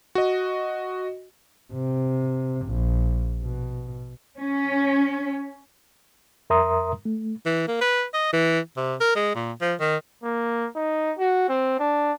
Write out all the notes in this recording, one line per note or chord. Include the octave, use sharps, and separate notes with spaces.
F#4 D#5
C3
A#1
B2
C#4
F2 A#4 E5 A#5 C6 D#6
A3
E3
A#3
B4
D#5
E3
C3
A#4
G#3
A#2
F3
D#3
A#3
D#4
F#4
C4
D4